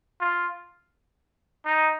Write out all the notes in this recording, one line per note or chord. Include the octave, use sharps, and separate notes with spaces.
F4
D#4